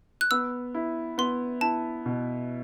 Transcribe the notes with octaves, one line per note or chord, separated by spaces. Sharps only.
F#6
B3 E6
E4
B3 C6
E4 A5
B2